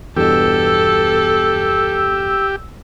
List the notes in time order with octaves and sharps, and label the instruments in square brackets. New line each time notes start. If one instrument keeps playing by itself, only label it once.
[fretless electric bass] E2 G2 B2 [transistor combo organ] G4 [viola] A4 [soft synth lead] E6